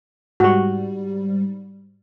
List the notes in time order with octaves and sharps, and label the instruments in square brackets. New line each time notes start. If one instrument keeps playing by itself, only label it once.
[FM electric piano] G#2 G3 [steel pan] F#4